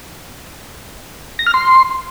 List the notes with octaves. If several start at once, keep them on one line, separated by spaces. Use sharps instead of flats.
A#6
F6
C6